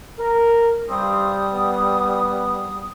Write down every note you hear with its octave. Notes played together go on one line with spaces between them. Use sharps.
A#4
G2 G3 C4 G4 D#6
B3